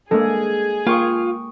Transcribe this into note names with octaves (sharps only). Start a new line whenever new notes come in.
G#3 A#3 D4 G#4 A4
A#3 F4 G5 C#6 D#6